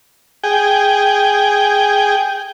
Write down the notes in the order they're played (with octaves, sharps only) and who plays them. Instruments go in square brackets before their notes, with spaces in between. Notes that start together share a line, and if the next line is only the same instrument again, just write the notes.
[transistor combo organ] G#4 G5